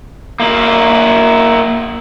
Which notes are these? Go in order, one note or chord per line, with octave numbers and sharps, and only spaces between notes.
A#3 E4